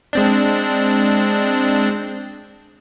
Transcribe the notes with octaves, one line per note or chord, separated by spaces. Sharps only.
G#3 C4 D4